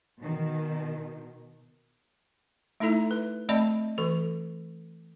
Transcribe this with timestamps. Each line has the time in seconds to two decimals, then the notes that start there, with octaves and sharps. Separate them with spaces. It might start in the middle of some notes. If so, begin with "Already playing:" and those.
0.19 B2 D#3
2.80 A3 D#4 E4 A4 E5 A#5
3.11 B4
3.49 A3 C4 D5 D#5 A5 B5
3.98 E3 A4 C#6